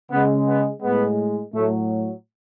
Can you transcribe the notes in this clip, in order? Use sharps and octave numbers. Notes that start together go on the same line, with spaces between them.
C#3 G#3 B3
B3
A2 G#3 B3
A2 F#3 A3